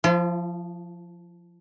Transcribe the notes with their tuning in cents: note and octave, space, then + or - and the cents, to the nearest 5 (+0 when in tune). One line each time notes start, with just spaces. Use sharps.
F3 +0 F4 -45